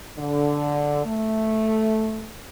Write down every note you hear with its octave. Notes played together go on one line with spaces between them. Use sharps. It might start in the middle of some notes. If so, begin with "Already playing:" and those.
D3
A3